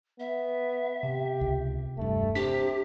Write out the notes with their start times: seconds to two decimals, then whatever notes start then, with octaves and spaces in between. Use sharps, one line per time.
0.20 B3 E5
1.03 C3 G4
1.41 C#2
1.97 E1 G2 A3
2.35 C3 D4 G4 B6